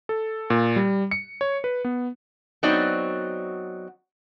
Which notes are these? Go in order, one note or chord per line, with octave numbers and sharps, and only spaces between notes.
A4
A#2
G3
C#7
C#5
B4
B3
F#3 B3 C4 D#4 F#4 D5